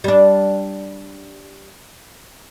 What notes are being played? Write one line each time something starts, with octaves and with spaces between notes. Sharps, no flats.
G3 D4